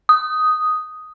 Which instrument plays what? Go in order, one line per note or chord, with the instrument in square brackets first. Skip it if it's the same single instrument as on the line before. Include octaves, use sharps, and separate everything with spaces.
[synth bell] D#6